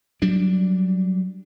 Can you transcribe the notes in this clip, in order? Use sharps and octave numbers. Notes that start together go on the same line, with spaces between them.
F#3 G3 D4